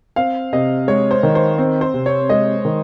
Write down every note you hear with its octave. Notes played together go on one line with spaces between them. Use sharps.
C4 F5
C3 D#5
G#3 C#5
C5
D#3
C5
C4
C5
C3
C#5
G#3 D#5
D#3